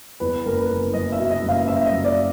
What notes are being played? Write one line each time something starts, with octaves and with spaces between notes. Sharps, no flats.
E2 B4
F#1 A#4
B4
F#1
F#1 D#5
E5
B2
D#5
F#1
F5
F#1 E5
D#5
F#1
D5